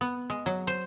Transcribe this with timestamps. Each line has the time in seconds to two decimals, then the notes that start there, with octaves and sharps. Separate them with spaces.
0.01 B3
0.30 G#3
0.46 F#3
0.67 C5